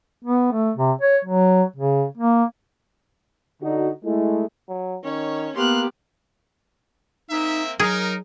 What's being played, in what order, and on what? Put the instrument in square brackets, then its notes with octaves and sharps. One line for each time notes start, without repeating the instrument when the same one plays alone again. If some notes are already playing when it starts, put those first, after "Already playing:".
[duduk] B3
A3
C3
C#5
F#3
C#3
A#3
[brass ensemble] D3 D#4 F#4
G#3 A3 E4
[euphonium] F#3
[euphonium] D#3 [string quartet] C#4 C#5
[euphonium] A#3 [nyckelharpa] B3 G4 [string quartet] C6 F6 F#6
[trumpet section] A#3 C4 E5 [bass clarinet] D#4
[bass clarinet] F#3 [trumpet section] D#4 A#4 [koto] G#4